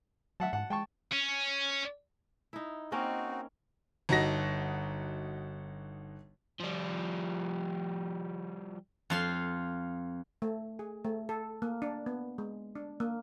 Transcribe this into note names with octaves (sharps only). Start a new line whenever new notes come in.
F#3 E5 F#5 A5
G#2 F#5 A5
G#3 G5 A5 C#6
C#4
D#4 E4
A#3 C4 C#4 D#4 F#4 A#4
G1 D#4 F#4 A#6
F3 G3
F2 F4 C6
A3
G#4
A3
A4
A#3
D4
B3
G#3
D4
A#3